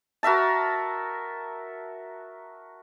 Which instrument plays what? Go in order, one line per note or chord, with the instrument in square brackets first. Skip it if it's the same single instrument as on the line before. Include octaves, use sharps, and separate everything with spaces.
[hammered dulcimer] F#4 A#4 E5 A5